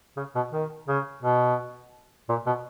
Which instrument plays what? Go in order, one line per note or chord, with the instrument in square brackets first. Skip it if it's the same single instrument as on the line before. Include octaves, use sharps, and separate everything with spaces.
[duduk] C#3
B2
D#3
C#3
B2
A#2
B2